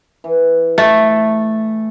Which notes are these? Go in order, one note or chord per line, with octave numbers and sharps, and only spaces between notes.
E3
A3